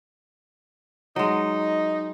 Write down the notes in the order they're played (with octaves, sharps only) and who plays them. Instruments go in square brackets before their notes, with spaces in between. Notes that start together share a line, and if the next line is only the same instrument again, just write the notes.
[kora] F#3 G#3 [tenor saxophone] D#4